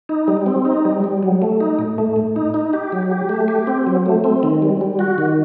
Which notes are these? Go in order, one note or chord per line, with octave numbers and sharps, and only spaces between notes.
D#4
G3
C4
D#4
G3
G3
F#3
A3
D#4
A2
A3
A2
D#4
D#4
G4
F#3
G4
A3
G4
C4
F#3
A3
C4
D#3
G3
G3
F#4
D#3